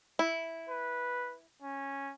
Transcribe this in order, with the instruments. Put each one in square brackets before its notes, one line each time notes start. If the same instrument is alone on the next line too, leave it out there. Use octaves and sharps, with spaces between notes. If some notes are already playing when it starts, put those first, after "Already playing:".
[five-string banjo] E4
[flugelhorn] B4
C#4